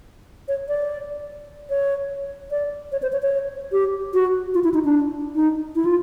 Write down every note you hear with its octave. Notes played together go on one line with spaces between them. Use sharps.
C#5
D5
C#5
D5
C#5
C5
C#5
C#5
G4
F#4
F4
E4
D#4
D4
D#4
E4
F4